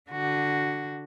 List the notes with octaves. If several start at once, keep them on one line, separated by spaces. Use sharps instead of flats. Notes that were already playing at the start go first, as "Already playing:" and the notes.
D3 F#4